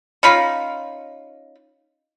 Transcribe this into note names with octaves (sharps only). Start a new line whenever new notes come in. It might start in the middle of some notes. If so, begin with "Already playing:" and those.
C#4 D#4 F4 B5